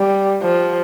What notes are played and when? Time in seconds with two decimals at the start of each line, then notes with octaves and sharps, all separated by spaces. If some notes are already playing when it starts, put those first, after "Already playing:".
Already playing: G3
0.42 F3